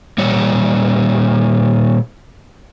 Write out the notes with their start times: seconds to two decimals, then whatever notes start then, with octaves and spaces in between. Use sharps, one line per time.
0.18 A#2 G3 C#5